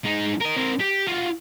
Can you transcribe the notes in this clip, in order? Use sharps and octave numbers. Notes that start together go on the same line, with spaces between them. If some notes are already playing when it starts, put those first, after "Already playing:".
G#3 D#4
A#4 D#5
C4 A#4
G4
F4 F#4